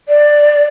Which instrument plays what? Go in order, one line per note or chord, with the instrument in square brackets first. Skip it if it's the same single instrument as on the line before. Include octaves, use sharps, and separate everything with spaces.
[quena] D5